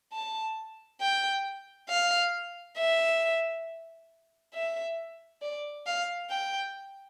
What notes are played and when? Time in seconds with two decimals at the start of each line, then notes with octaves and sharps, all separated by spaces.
0.12 A5
1.01 G5
1.89 F5
2.78 E5
4.54 E5
5.42 D5
5.86 F5
6.30 G5